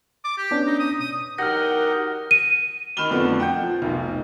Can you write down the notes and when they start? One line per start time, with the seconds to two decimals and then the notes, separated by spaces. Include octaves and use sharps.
0.25 D6
0.38 G4
0.51 B3 C#4 D4
0.67 D#4
0.79 D#6
1.00 B2 D#6
1.38 E2 F#3 D#4 G4 A#4 F#5 F6 A#6
2.31 D#7
2.97 D#3 B5 F6 E7 G7
3.11 F2 B2 D3 F3 A3 B3
3.40 F#5 G5 G6
3.63 F3
3.82 F1 B1